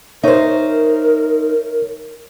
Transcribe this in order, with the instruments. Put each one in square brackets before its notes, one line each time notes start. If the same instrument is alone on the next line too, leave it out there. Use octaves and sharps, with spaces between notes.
[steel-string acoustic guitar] D#4 C5 [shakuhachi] A#4 [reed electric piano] C#5 E5